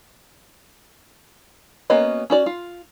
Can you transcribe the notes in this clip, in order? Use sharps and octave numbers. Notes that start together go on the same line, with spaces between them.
A#3 B3 C#4 F#4 D#5
C#4 F#4 D5
F4